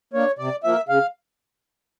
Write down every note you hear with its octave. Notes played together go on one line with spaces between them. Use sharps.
A#3 D4 C#5
C3 D5
F3 A#3 E5
C#3 F5